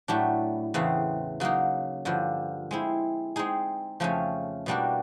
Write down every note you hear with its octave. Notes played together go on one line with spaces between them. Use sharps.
A2 F#3 A3 D4 G4
E2 C#3 E3 A3 C4
C#3 F#3 A#3 D#4
G2 D3 F3
G#3 C4 E4
G#3 C4 D#4 G#4
F2 C#3 F3 A3 C#4
B2 G3 A#3 D4 F#4